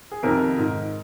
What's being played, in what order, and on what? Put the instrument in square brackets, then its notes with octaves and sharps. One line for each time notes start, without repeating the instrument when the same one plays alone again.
[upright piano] G#4
F2 C3 D#3 A#4
G#2 D#3